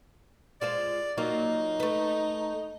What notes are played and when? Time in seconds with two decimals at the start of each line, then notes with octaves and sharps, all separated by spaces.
0.61 G#3 F4 C5 D5
1.17 F#3 A#3 D#4 F4
1.80 A3 B4